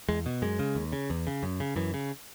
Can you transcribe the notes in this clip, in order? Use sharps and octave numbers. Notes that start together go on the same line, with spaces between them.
E2 G#3
B2
F#2 G#3
C#3
D#2
C#3
E2
C#3
F#2
C#3
F#2 E3
C#3